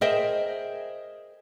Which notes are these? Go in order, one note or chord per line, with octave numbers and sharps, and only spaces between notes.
G#4 A#4 C5 D#5 E5 G5